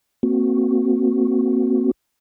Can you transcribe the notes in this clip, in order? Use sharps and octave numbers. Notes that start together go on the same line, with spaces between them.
A#3 C4 F#4